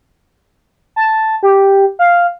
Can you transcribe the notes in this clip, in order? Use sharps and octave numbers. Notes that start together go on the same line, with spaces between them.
A5
G4
F5